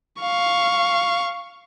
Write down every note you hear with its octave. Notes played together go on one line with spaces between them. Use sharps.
F5 C#6